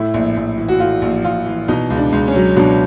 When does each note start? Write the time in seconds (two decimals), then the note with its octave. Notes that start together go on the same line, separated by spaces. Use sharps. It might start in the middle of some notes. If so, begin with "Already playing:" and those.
Already playing: A2 E4
0.14 A#1
0.37 A#1
0.57 E3
0.68 F#4
0.80 A2 F4
1.02 A#1
1.25 A#1 F4
1.46 E3
1.68 B2 D#4
1.90 C#2
1.98 D4
2.12 C#2
2.28 C#4
2.35 F#3
2.57 B2 D4